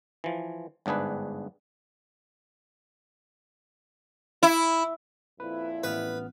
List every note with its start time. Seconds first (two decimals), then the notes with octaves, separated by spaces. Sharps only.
0.24 E3 F3
0.86 G1 G#2 D4 G#4 B4
4.43 E4
5.40 F2 A#2 E4 B4
5.84 A1 B3 B4 F6